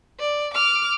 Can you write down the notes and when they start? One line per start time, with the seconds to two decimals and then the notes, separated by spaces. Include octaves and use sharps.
0.20 D5
0.54 D6 F6